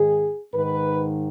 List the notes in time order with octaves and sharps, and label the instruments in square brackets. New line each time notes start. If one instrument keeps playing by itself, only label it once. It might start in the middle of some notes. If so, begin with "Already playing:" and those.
Already playing: [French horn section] G#2 D#3 G#4
G#2 D#3 B4